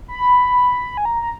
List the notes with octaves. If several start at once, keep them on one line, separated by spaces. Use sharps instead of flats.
B5
G#5
A#5
A#5